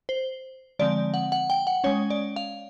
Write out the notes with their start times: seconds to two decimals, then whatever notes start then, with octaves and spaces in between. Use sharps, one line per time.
0.09 C5
0.79 D3 F3 G#3 C4 D5
1.14 F#5
1.32 F#5
1.50 G5
1.67 F#5
1.84 G#3 C#4 C#5
2.10 D5
2.36 F5